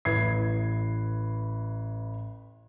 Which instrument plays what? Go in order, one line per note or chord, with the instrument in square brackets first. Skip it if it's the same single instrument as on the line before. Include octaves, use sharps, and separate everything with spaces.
[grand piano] A1 B4 E5 G#6 C7